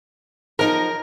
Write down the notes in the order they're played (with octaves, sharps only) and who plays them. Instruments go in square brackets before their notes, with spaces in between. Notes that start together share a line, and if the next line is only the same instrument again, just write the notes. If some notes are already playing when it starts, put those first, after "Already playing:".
[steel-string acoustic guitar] F3 F#3 D#4 [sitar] A#4